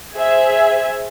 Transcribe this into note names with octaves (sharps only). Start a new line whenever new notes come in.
G#4 C5 E5 G#5